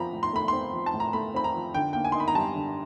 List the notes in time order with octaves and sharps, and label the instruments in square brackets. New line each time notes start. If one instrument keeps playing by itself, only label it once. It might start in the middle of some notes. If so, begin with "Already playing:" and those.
Already playing: [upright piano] F3 C4 A#5 B5
A2
C6
A3 B5
C4 C6
F3
A5
A2
A#5
A3 B5
C4 B5
A#5
F3
D3 G5
A#3 G5
G#5
C6
D#4
B5
A#5
G3 A5
D3